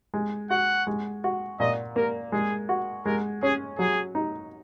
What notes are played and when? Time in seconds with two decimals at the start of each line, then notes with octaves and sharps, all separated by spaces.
0.14 G#3
0.50 F#4 F#5
0.87 G#3
1.24 F#4
1.60 A#2 D#5
1.96 A#3 A#4
2.32 G#3 G#4
2.69 F#4
3.06 G#3 A#4
3.43 C#4 G#4
3.79 F#3 G#4
4.15 D#4